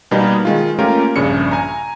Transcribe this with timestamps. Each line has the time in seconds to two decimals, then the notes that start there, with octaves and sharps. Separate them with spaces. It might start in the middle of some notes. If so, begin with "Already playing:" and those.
0.11 B2 G3 A#3 B3 D#4
0.45 D#3 G#3 F4
0.79 A3 A#3 C#4 F4 G4 A#4
1.16 A#1 G2 C#3 C#7
1.51 G#5 A#5